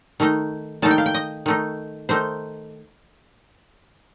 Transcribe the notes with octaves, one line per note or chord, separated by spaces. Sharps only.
D#3 A3 D#4
D#3 A3 D#4 A5
G5
F5
G5
D#5
D#3 A3 D#4
D#3 A3 D#4 C5